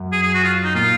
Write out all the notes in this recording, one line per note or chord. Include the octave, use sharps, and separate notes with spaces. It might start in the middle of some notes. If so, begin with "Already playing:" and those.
Already playing: F#2
G#4
G#4
F#4
F4
D#4
A#2 F4